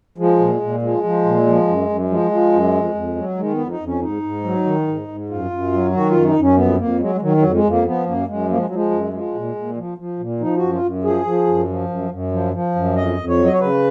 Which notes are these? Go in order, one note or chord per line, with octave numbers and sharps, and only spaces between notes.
F3 G#3
A#2
A#2
F3 G#3
F3
A#2
F3
F#2
F#2
F3 G#3
F3
F#2
F2
F2
F#3
D#3 G#3
B3
F2
D#4
F2
C#4
G#2 D#4
G#2
F#3
D#3
G#2
G#2
F#2 F4
F#2
F#3
D#3 F#4
F4
F#2
D#4
F#2
C#4
F2 B3
F2 A#3
F#3 G#3
G#3
D#3 F#3
F#3
F2
G#3
F2
A#3
F3 B3
F#2 A#3
F#2 G#3
F3 A#3
G#3
F3 F#3
G#3
F#2
F3 G#3
A#2
A#2
F3
F3
A#2
F3 D#4
F#4
F#2
F4
F#2
F3 G#4
F3
F#2
F3
F#2
F#2
F3
F3
F#2
F2 D#5
F2
C#5
F#3
D#5
C#5
C#3 B4